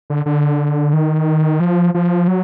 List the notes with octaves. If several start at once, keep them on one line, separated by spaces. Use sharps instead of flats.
D3
D3
D#3
F3
F3
F#3